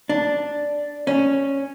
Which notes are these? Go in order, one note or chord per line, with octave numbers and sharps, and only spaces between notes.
D4
C#4